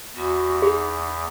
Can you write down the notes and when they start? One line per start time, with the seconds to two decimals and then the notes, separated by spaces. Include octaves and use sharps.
0.16 E2 F#4
0.62 D#4 G#4